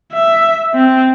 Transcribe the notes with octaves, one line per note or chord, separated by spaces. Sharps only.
E5
C4